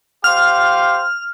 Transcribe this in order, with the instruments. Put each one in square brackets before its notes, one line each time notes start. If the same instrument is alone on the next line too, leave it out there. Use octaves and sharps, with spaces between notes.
[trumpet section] G4 C5 F5 [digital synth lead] F6